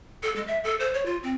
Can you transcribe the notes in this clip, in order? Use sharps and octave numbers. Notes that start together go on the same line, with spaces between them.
A4
G#3
E5
A4
C5
C#5
F4
C4